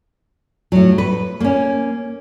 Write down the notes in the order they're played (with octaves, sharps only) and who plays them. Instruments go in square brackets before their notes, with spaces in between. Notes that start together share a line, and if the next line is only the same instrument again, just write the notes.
[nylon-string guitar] A2 F#3
B4
A#3 C#4